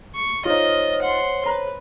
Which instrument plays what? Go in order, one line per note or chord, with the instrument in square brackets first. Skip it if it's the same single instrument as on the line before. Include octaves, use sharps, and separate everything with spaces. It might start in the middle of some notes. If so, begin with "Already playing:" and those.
[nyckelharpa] C#6
[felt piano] D#4 F4 [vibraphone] C5 C#5 [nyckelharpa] D#5
[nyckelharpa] F#5 C6
[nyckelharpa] B4 [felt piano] A#5